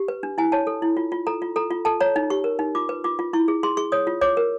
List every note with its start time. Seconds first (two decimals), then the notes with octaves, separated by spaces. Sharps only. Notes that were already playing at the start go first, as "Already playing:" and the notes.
Already playing: G4
0.08 B4
0.23 D4
0.38 E4 G#5
0.52 C#5 A5
0.67 A4
0.82 E4
0.97 F4
1.12 F4
1.27 A4 A#5
1.42 F4
1.56 A4 A#5
1.71 F4
1.85 A4 A5
2.00 C#5 A#5
2.16 D#4
2.30 G4 C#6
2.44 A#4
2.59 D#4
2.75 F4 D6
2.89 B4
3.04 F4 D6
3.19 F4
3.33 E4 C#6
3.48 G#4
3.63 G#4 C6
3.77 G#4 C#6
3.92 C#5 D#6
4.07 F4
4.21 C#5 D6
4.37 A#4